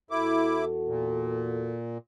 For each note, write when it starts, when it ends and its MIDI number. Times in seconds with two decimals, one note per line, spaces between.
0.11 1.76 40
0.11 0.65 64
0.11 1.76 66
0.11 1.76 69
0.11 0.65 86
0.87 1.98 46